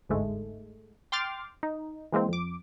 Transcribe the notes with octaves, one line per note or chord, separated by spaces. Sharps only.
G1 D2 G#2 G#3 A3
G5 C6 D6 F6 A6
D#4
E3 G#3 A#3 C4
F2 D6